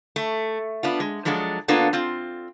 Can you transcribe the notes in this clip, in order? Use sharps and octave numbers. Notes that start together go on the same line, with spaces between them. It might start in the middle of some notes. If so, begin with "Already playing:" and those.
A3
B3 D4 F4
G#3
F3 F#3 G#3 D4 A4
A#3 B3 D4 F4 A4
C4 F4